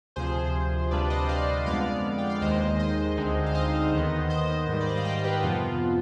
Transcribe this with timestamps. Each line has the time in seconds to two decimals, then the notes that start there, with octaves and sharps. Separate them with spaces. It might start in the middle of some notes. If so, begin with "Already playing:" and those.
0.16 D2 C3 F3 G#4 C5
0.91 D2 C3 G3 D4 F4 B4 D5
1.10 C5 D#5
1.29 D5 F5
1.66 F2 D3 G#3 B3 D5 F5
2.18 G5
2.30 F5
2.41 D#2 D#3 G#3 C5 D#5
2.79 C5 D#5
3.17 D2 D3 G#3 C4 D#4
3.46 F5
3.55 C5 D#5
3.93 D#2 D#3 B3
4.30 C5 D#5
4.68 G#2 D#3 G3
4.80 D5
4.89 D#5
4.97 F5
5.05 D#5 G5
5.24 G4 B4
5.43 F2 C3 F3 B3 F4